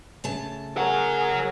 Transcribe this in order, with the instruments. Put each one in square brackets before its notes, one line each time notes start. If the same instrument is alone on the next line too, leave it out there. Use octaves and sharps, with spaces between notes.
[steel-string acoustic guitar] C#3 A3 A5
[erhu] G#4 [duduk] A#4 [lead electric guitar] C#5 F#5